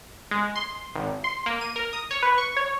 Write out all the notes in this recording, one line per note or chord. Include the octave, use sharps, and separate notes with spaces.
G#3
C6
G#1
C6
A#3
D#7
A#4
D#6
C#5
B4
C#6
C#5